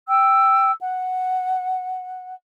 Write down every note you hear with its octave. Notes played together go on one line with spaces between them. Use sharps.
G5 E6
F#5